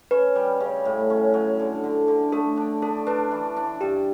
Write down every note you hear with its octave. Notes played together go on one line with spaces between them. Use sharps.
C#4 B4
G3
C#3
A2
C#4
F#3
D3
D3
D3
A3 A4
D4
D4 A4
D4 B4
E3
D4
G2 G4